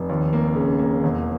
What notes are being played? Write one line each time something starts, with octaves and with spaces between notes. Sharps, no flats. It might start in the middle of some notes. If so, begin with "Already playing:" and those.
Already playing: F1
D#2
A#3
C#3
A#3
E1